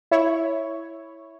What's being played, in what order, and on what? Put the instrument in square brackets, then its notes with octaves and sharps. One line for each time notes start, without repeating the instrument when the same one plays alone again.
[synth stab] E4 C#5